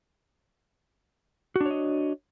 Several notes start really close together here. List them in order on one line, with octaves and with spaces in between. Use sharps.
F#4 D4 C#5 D#5